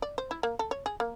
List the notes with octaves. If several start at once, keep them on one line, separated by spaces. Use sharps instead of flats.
D5
C5
E4
A#3
A4
C#5
G#4
A#3